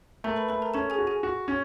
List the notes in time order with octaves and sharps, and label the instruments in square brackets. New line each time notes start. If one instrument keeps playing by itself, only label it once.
[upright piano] A3 [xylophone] A#4 A#5
[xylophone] B4 B5
[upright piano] A3 [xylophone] B4 B5
[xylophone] A#4 A#5
[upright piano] C#4 [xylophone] A4 A5
[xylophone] G#4 G#5
[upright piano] F#4
[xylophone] G#4 G#5
[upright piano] F#4
C#4